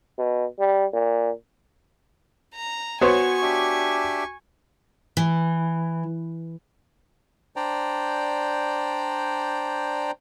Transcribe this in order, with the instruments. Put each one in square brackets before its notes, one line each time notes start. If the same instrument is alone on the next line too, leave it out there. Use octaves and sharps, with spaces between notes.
[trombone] B2
G3
A#2
[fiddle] A#5
[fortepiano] B3 C5 C#5 [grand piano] F#4 [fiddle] G#5 C#6
[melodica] D4 G4 E5
[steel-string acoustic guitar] E3
[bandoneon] D4 C5 D5 G5 A#5